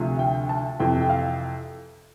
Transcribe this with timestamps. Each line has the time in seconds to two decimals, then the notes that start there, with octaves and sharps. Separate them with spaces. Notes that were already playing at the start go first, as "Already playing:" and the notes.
Already playing: D2 C3 F3 A3
0.19 G5
0.49 A5
0.79 F2 C3 E3 G5
1.01 G5
1.09 F5